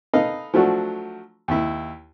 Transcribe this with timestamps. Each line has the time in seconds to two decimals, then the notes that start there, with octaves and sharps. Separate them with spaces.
0.13 D#4 A4 B4 D#5 F5
0.54 F3 F#3 A3 D4 F#4
1.48 D#2 E4